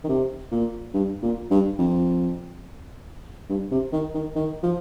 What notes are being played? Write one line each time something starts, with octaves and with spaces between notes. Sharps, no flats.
D#3
C3
A#2
G2
A#2
G2
F2
G2
C3
D#3
D#3
D#3
F3